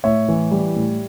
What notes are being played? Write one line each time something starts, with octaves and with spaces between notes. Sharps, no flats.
A2 C#5 E5
E3
G3
A2